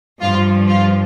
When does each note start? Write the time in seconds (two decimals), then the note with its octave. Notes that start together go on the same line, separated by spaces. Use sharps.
0.20 G2 F3 F4
0.68 F4